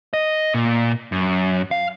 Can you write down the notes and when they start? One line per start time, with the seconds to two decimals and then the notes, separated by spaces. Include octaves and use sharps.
0.13 D#5
0.54 A#2
1.12 F#2
1.71 F5